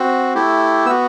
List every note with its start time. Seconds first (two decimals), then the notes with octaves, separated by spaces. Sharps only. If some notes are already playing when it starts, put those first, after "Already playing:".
Already playing: C4 F#4
0.35 A3 E4 G4
0.85 B3 E6
0.90 F#4